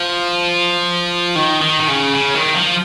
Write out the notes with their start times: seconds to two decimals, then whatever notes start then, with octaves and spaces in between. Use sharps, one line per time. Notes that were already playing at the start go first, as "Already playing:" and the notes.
Already playing: F3
1.36 D#3
1.62 D#3
1.80 D#3
1.88 C#3
2.15 C#3
2.35 D#3
2.54 F3